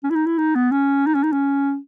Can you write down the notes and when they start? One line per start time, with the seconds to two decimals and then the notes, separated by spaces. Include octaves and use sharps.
0.04 C#4
0.10 E4
0.15 D#4
0.26 E4
0.38 D#4
0.55 B3
0.72 C#4
1.06 D#4
1.15 C#4
1.23 D#4
1.32 C#4